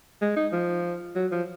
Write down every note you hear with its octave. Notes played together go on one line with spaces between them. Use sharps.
G#3
D#4
F3
F#3
F3